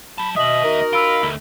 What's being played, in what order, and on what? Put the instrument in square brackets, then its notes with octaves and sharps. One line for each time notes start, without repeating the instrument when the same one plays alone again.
[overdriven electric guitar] F#3 A5 [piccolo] B5
[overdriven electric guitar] D#2 E5 [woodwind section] B2 [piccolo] D#5 [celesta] D#6 F#7
[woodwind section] D#4 F#4 A#4
[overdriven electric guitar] F4 [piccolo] B5 [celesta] E6 D7
[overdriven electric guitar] D2 A3